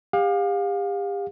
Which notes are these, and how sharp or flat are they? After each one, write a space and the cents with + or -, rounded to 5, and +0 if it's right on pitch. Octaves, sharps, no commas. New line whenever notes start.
G4 +35 F5 +30